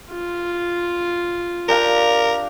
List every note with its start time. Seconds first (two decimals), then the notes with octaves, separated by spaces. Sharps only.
0.11 F4
1.69 D4 G4 A#4 F5